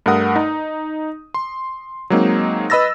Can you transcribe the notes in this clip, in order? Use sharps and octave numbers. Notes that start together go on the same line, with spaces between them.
G2 A3 A#4 F#5 D#6
D#4
C6
F#3 G#3 A#3 C4 D#4
B4 D#5 B5 E6 A6 A#6